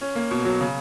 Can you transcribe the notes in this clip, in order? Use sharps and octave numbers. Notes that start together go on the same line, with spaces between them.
C#4
A#3
B2
F#3
C#3